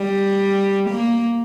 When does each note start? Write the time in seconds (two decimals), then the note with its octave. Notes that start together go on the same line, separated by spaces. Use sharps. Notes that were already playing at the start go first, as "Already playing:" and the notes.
Already playing: G3
0.90 A#3